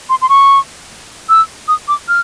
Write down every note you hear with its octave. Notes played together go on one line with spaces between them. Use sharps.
C6
C6
C#6
E6
D#6
D6
F6